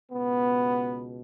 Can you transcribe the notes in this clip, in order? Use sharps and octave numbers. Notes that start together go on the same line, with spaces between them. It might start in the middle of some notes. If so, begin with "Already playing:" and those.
C#2 B2 B3